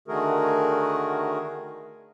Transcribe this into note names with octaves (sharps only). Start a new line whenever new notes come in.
D3 D#3 A3 F#4 G#4 A#4